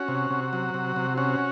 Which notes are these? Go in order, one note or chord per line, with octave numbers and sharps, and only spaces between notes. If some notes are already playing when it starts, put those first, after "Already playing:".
Already playing: C#4 F#4
C3
C3
F#3
C3
C3
C#4 F#4